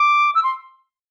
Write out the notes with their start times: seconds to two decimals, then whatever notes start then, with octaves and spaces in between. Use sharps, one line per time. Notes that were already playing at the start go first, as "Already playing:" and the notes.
Already playing: D6
0.35 E6
0.44 C6